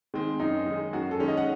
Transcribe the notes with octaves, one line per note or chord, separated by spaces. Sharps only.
D#3 G#3 C4
F#2 D#4
D#3 G#3
F#2 F#4
A4
D#3 G#3 C#4
D#5
F#5